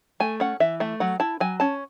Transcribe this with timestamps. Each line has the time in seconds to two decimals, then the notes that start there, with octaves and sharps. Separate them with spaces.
0.20 A3 G#5
0.40 C#4 F#5
0.60 E3 E5
0.80 A3 E5
1.00 F#3 F#5
1.20 E4 A5
1.40 F#3 G#5
1.60 C#4 A5